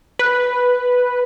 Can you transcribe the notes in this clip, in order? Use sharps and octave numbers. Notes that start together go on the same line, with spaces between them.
B4